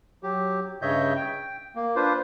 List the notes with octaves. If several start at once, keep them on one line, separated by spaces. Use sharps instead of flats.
F#3 G4
G2 C#3 C#5 D#5 E5 G6
G5
A#3
D4 F4 B4 C5